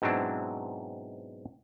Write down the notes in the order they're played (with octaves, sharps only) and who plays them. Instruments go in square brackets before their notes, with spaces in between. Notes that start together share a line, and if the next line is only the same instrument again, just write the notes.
[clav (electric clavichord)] G#2 B2 F#3 C4 D4 E4